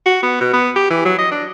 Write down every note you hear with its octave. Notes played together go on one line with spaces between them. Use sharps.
F#4
B3
B2
B3
G4
E3
F#3
D#5
D4